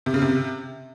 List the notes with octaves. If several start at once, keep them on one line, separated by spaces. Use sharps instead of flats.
C3
C#3
C3